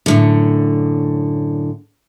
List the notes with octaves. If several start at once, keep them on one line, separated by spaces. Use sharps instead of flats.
F#2 A2 D3